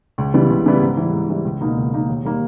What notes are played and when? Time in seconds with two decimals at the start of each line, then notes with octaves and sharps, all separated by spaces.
0.18 C#2
0.34 C#3 E3 G3 B3
0.50 C#2
0.66 C#3 E3 G3 B3
0.82 G#2
0.97 E3 G3
1.13 G#2
1.30 E3 G3
1.45 C#2
1.61 B2 A#3 D#4
1.77 C#2
1.93 B2 A#3 D#4
2.09 D#2
2.25 D#3 G3 A#3